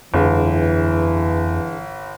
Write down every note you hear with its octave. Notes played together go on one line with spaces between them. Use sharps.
G1 F2 E3 D4 G#4 B4